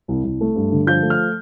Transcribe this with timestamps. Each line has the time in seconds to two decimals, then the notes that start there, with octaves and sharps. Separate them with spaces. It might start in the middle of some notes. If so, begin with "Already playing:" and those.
0.08 C2
0.24 C2
0.41 A3
0.56 G2
0.72 D3
0.87 F3 G6
1.03 A3
1.10 F6